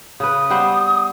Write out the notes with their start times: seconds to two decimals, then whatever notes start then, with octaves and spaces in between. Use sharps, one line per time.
0.20 C#3 B4 D#6
0.50 G3 B3 C5